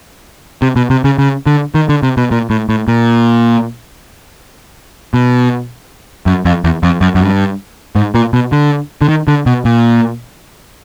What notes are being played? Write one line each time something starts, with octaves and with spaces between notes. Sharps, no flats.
C3
B2
C3
C#3
C#3
D3
D#3
D3
C3
B2
A#2
A2
A2
A#2
B2
F#2
F2
E2
F2
F#2
F#2
G2
G#2
A#2
B2
D3
D3
D#3
D3
B2
A#2